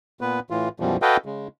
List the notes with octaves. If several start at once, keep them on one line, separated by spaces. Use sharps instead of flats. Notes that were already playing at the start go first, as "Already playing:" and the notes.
A#2 B3 B4
A2 E3 F4
F#2 B2 E3 F3 G3
F#4 A4 B4 D#5 F5 G5
C#3 G#3